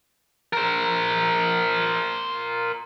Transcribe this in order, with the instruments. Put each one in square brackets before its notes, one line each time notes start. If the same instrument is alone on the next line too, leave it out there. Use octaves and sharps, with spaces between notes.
[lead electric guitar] A#4 C5